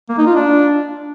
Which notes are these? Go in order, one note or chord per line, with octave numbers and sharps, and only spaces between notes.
A#3
D#4
F4
D4